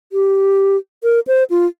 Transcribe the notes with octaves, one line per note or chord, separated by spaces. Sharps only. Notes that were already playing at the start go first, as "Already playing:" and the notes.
G4
A#4
C5
F4